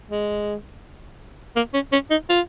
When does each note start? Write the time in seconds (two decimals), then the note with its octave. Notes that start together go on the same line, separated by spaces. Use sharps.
0.11 G#3
1.56 A#3
1.74 C#4
1.92 C#4
2.11 D#4
2.29 F4